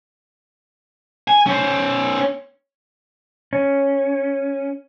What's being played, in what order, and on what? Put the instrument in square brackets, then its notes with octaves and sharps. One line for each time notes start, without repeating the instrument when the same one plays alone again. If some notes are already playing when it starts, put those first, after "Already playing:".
[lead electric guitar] G#5
C#4 C5
[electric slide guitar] C#4